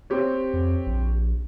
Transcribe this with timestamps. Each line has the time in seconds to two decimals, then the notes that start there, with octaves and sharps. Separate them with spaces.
0.10 C4 G4 C#5
0.53 F2
0.86 A#1